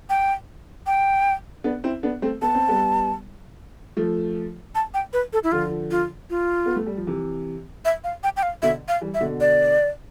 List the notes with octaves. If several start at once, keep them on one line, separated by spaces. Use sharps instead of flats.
G5
G5
B3 D4
C4 E4
B3 D4
A3 C4
B3 A5
C4
G3 B3
F3 A3
A5
G5
B4
A4
E4
D3 F3 F4
F4
F4
B3
A3
G3
F3
C3 E3
E5
F5
G5
G5
F5
B2 D3 E5
F5
E3 G3
E5
B2 D3
D5